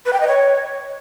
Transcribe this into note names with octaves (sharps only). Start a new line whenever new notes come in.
B4
G5
D#5
C#5